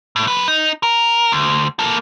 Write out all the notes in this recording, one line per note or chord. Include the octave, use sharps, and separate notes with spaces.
A2
F#2 B4
D#4
A#4
D2
A#3 A4